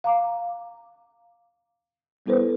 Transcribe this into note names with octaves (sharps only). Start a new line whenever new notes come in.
F5 A#5 D6
G3 B3 E4 A4 B4 C5